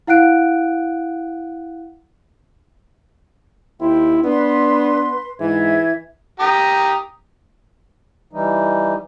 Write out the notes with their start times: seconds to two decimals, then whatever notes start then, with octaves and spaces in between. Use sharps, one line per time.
0.07 E4 F5 F#5 F#6 D7
3.80 D#2 E4 G5 C6
4.24 B3 D4 B4 C6
5.40 G#2 E3 E5 G#6
6.40 G4 A#5 D#6
8.33 E3 G3 D#4